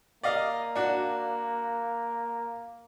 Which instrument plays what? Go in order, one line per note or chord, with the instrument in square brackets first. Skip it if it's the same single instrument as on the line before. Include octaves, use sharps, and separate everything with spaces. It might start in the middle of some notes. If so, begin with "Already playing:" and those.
[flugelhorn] A#3 [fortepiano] D5 D#5 F5
[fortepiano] D4 F#4